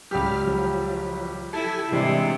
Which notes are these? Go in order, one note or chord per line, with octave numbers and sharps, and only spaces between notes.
C#2 F#3 G3 G4 F6
F3 F#3
E4 G4 A4 G#5 A5
C3 E3 G3 G#3 D4 E4